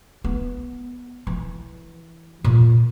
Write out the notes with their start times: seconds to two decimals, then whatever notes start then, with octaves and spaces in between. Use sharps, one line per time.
0.24 B3
1.27 E3
2.44 A#2